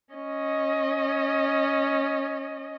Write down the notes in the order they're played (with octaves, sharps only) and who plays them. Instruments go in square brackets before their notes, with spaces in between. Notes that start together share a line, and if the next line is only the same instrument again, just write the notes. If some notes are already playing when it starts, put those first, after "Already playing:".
[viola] C#4 D#5